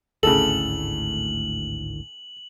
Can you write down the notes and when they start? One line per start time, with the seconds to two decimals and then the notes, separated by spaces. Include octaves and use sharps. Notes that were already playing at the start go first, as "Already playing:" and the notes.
0.23 G#1 D2 A2 C#3 A4 F#7